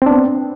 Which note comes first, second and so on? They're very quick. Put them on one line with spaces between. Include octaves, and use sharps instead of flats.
C4 D4 B3